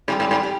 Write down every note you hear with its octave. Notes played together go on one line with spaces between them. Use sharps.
G#2 G3 C4 G4
G#2
G#2
G4